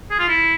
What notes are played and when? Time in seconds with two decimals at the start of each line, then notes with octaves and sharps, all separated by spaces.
0.10 G#4
0.19 F4
0.28 E4